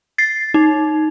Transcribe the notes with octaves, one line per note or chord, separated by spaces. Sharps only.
A6 C7
D#4